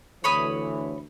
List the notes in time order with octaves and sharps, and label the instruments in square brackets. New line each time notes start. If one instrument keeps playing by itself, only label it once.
[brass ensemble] D2 D3 E3 [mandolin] C#5 B5 D#6